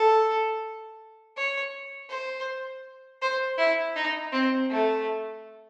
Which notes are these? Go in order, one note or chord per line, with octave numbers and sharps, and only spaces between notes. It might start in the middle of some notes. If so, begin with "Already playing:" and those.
Already playing: A4
C#5
C5
C5
E4
D#4
C4
A3